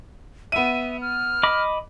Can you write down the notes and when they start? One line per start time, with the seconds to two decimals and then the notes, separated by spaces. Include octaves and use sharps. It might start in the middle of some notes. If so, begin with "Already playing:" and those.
0.52 B3 E5 D#7
1.01 F6
1.43 D#5 B5 D6